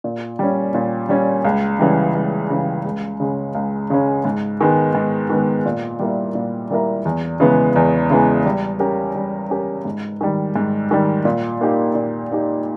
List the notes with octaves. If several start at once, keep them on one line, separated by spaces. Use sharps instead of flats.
A#2
G3 C#4
A#2
G3 C#4
C#2
C#3 E3 G3
C#2
C#3 E3 G3
C#2
C#3 G#3 C#4
C#2
C#3 G#3 C#4
G#2
D#3 G#3 B3
G#2
D#3 G#3 B3
A#2
G3 A#3 E4 A#4
A#2
G3 A#3 E4 A#4
E2
C#3 E3 G#3 B3
E2
C#3 E3 G#3 B3
G3
C#4 G4 A#4
G3
C#4 G4 A#4
G#2
D#3 G3
G#2
D#3 G3
A#2
A#3 D#4 G4
A#2
A#3 D#4 G4